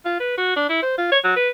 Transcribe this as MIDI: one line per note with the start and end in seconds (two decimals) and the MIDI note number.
0.05 0.16 65
0.20 0.34 71
0.38 0.55 66
0.56 0.68 62
0.69 0.78 64
0.82 0.94 72
0.98 1.11 65
1.12 1.19 73
1.24 1.36 54
1.36 1.49 71